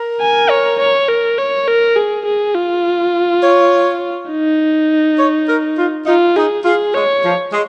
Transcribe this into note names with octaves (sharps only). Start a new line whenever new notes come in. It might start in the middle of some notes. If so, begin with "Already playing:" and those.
Already playing: A#4
G#5
C#5
C#5
A#4
C#5
A#4
G#4
G#4
F4
C#5
D#4
C#5
A#4
F4
D#4 F4
D#4 G#4
F4 G#4
G#3 C#5
F3
G#3